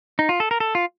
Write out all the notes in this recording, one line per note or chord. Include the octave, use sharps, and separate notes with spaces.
D#4
F4
A4
A#4
A4
F4